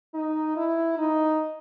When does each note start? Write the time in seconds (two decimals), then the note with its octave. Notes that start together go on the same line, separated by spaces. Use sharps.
0.14 D#4
0.56 E4
0.98 D#4